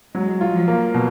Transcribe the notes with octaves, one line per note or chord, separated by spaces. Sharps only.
F#3 G#3
F4
F3
A#3
B2